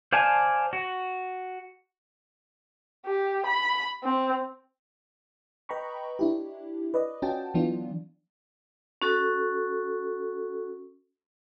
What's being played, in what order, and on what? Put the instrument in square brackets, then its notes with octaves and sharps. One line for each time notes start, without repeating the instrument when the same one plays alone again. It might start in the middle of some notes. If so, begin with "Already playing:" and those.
[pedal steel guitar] C5 D5 F5 G#5 A5
F#4
[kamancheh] G4
B5
C4
[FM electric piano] B4 D#5 G5 A#5 B5 C#6
D4 E4 G4
B4 D5 D#5
C#4 F4 F#4 G5 A5
E3 F#3 B3 D4 F4
[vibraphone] C#4 F#4 A4